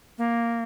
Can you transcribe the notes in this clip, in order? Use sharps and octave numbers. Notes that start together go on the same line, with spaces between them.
A#3